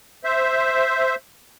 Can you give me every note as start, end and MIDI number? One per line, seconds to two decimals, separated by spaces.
0.24 1.15 72
0.24 1.15 76